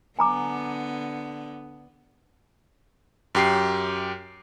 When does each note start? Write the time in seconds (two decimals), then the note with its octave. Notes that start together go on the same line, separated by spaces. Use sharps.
0.19 D3 B3 G#5 A#5 D6
3.35 F#2 G4 C7